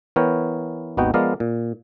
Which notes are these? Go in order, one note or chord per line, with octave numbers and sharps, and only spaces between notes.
E3 B3 A#4 C#5 G5
G#1 D#2 B3 D#4 F#4 G5
F3 G#3 B3 A#4 D5 F5
A#2